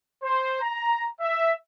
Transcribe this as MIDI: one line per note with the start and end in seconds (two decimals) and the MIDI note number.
0.23 0.58 72
0.61 1.07 82
1.20 1.52 76